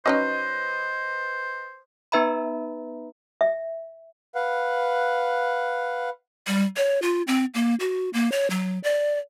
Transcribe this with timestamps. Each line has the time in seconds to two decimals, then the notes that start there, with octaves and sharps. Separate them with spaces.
0.06 F#3 C#4 D#4 B4 C5 D#5
2.12 B3 D#4 B4 E5 A#5 B5
3.41 E5
4.35 B4 F5 F#5
6.47 G3
6.76 C#5
7.02 F4
7.27 C4
7.54 A#3
7.80 F#4
8.13 A#3
8.32 C#5
8.50 F#3
8.84 D5